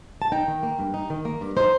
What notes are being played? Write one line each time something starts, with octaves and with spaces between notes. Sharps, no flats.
A5
D#4 G5
D#3
A#3
G2
D#4
D#3
A#3
G2
D#4 C5